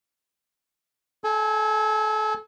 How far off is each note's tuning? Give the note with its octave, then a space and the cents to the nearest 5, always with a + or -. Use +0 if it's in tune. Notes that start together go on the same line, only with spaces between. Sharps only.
A4 -30 G#5 +0